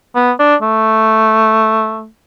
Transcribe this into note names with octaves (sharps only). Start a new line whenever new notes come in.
B3
D4
A3